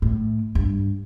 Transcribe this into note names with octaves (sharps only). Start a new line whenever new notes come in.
A2
G2